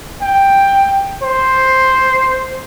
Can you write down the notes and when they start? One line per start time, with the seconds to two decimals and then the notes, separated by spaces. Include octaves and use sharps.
0.22 G5
1.23 C5